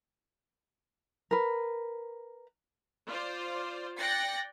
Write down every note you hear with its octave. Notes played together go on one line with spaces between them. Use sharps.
A#4 B4
F4 C5 D5
D5 G5 F#6 A6 A#6 C#7